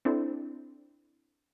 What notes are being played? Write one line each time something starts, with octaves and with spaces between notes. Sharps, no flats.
C4 D4 E4 A4